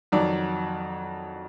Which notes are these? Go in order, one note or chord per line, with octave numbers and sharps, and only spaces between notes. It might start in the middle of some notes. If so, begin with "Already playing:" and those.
F2 D#3 F#3 D5